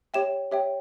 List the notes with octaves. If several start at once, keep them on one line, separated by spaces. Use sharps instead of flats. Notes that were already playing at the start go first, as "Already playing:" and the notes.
G4 C#5 E5 G5 E7
G4 C#5 E5 G5